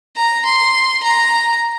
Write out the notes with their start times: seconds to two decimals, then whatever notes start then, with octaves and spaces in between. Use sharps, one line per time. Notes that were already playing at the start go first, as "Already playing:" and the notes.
0.16 A#5
0.45 C6
1.03 A#5